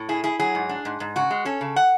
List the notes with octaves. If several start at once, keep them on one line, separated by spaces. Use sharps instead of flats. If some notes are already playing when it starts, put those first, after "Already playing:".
Already playing: A2
E4 G#4
E4 G#4
F#3 G#4
G#2
D4
G#2
G#2
C#3 F#4
G#3
C#4 A4
C#3
F#5